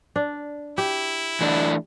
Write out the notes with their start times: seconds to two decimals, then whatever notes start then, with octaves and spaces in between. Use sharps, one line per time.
0.16 D4
0.78 E4 G4
1.41 E3 A3 D4